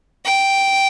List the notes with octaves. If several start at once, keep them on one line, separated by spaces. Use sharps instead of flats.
G5